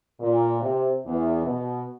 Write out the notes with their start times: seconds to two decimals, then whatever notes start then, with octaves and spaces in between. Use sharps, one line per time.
0.19 A#2
0.61 C3
1.06 E2
1.44 B2